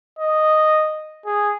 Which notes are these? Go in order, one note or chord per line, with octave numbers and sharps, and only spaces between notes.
D#5
G#4